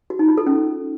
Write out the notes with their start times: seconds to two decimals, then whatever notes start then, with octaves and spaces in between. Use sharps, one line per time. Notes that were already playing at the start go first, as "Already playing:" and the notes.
0.10 F#4
0.19 D#4
0.28 F4
0.37 A4
0.47 C#4